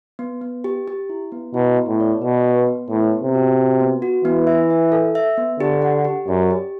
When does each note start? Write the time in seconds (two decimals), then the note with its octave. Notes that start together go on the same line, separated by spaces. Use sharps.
0.19 B3
0.41 B3
0.64 G4
0.88 G4
1.09 E4
1.32 B3
1.54 B2 E4
1.77 B3
1.89 A2
2.00 D5
2.22 B2 B4
2.44 B3
2.67 B3
2.89 A2 B4
3.12 B3
3.24 C3
3.35 F#4
3.58 F#4
3.80 B3
4.02 F#4
4.25 E3 B3
4.47 E5
4.70 E5
4.92 A4
5.15 E5
5.38 B3
5.60 D3 G4
5.82 F#5
6.05 G4
6.28 F#2 D5
6.51 G4